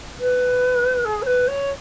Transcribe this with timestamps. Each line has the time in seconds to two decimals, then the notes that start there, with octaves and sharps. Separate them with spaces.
0.19 B4
1.05 G#4
1.22 C#5
1.26 B4
1.47 C#5